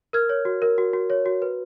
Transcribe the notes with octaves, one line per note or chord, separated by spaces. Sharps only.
A#4 F6 G#6
C#5
F#4
A#4
F#4
F#4
C#5
F#4
B4